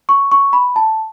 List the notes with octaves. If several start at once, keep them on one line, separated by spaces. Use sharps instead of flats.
C#6
C#6
B5
A5